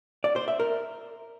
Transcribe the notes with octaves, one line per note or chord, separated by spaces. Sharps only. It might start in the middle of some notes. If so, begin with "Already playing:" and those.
D5
C5
E5
A#4